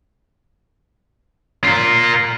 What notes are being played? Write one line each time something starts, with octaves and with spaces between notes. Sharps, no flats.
F4 A#4